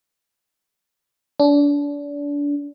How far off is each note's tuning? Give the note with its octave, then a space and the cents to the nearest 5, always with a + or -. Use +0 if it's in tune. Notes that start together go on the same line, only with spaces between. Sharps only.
D4 -30